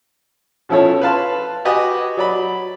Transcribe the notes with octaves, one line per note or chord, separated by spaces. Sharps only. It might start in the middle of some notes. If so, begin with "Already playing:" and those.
B2 F3 C#4 E4 A4 C#5
B4 F5 A5 C6
F#4 G4 B4 D#5 G#5
F#3 D5 B5